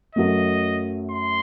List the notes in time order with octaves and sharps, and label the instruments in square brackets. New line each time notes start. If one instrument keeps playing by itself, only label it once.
[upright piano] F#2 F#3 A3 [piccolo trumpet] D#5
[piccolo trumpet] C6